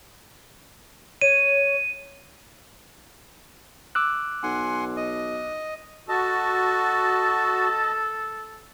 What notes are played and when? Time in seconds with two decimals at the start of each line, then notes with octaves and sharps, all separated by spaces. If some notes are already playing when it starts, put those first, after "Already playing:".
1.22 C#5 D#7
3.95 D6 E6 F#6
4.43 B1 F#5 G#5 C6
4.97 D#5
6.09 F#4 A4 D#5 A5